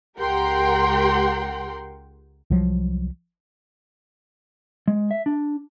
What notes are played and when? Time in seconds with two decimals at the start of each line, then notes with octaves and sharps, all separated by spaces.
0.19 C#2 G4 A#4 F#5 G5 C6
2.50 C2 F3 F#3
4.88 G#3
5.11 E5
5.26 D4